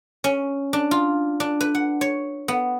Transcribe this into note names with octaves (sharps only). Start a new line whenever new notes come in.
C#4
D4
F4
D4
B4
F#5
C#5
B3